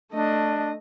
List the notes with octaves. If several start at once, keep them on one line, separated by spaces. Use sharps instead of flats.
A3 D4 D#5